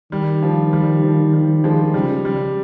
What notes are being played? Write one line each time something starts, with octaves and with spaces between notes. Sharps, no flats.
D#3 G3
F3
G3
F3
G3
F3 G#3
C#3 G3
G3